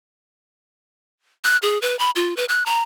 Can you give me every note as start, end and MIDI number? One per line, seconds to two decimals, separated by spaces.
1.44 1.57 90
1.62 1.80 68
1.82 1.98 71
1.99 2.10 83
2.16 2.36 65
2.37 2.45 71
2.49 2.66 90
2.66 2.83 82